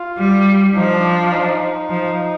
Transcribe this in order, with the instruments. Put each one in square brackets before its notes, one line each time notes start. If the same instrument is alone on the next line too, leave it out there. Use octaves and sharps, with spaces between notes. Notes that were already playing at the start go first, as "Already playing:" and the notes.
Already playing: [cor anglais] F4
[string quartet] G3
[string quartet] F3 [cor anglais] D#4
[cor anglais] D4
D4
D#4
D4
D#4
[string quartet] F3